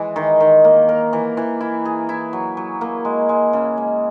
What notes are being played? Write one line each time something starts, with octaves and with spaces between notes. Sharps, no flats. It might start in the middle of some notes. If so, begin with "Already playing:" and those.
Already playing: E3 G#3
D#3
D#3
A#3
A#4
E3
E3
E4
G#4
E4
F#3
F#3
A#3
G#3
G#3
C#3
G#3